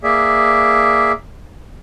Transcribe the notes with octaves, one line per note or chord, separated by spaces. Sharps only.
A#3 G#4 D5 E5